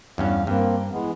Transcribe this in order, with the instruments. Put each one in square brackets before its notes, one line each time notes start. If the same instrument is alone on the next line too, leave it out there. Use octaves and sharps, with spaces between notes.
[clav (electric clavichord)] E2 G2 C#4 [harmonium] F5
[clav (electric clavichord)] G2 [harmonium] A#3 C4
[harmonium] E3 G#3 B3